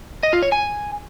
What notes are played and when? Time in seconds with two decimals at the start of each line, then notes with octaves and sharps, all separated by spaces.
0.23 D#5
0.33 F4
0.43 C#5
0.52 G#5